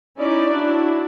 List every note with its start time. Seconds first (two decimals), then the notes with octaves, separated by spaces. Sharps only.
0.17 C#4 D#4 E4 D5
0.49 D4 E4 F#4